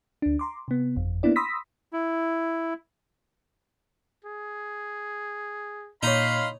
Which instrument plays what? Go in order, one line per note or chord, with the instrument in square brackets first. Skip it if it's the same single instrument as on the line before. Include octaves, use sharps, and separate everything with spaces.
[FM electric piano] D2 D4
A#5 C6 D6
C3 B3
G1 F2
A#3 B3 D4 E4 D5
B5 C6 D#6 E6 A#6 B6
[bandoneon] E4
[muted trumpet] G#4
[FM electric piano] A#2 C#5 [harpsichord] D#4 [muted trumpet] F5 [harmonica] B5 C6